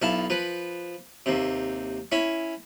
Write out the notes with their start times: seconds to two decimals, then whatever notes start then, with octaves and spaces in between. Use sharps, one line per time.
0.02 B1 E4 F5 A5
0.30 F3 B4
1.26 D#2 C3
2.12 C#4 E4